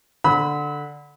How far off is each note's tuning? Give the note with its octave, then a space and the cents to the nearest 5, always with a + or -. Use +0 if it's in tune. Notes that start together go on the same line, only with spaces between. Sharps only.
D3 +0 B5 +0 E6 -40